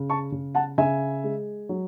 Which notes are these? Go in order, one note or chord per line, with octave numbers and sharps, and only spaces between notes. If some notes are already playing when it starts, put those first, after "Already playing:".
Already playing: C#3
A5 C#6
C#3
F#5 A5
C#3 E5 G#5
G#3
F#3